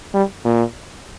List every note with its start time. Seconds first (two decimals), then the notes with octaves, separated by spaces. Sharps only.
0.14 G3
0.45 A#2